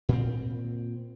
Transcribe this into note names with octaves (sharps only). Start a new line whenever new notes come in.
A#2 C4